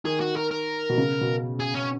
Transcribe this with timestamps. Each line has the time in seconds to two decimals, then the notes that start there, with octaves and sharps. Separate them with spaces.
0.05 D#3 G#4
0.20 F#4
0.36 A#4
0.51 A#4
0.89 B2
0.98 C#3
1.21 B2
1.60 G#4
1.75 C#4